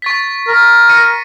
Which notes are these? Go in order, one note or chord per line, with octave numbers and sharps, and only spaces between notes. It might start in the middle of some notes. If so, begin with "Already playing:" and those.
C#6 A6 B6
A#4
A#6 C#7 D#7